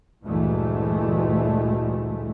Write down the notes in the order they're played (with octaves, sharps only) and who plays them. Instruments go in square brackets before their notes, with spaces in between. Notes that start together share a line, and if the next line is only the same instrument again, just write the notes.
[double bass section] D2 G2 A#2 E3 G#3 A3